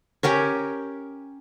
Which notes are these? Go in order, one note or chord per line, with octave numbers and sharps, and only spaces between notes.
C#4 G4 A#4 C#5